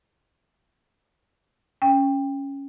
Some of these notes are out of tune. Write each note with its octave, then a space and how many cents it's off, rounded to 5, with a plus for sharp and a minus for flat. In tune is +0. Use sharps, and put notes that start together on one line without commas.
C#4 +0 G5 +20